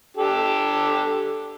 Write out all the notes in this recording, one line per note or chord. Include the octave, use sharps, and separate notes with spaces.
D4 G4 A4